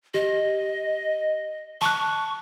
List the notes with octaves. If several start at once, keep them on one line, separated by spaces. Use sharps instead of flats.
G4 D#5
A5 C#6 F#6